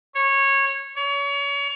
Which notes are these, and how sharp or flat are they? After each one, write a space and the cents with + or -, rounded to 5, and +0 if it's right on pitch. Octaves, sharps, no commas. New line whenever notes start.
C#5 -15
C#5 +30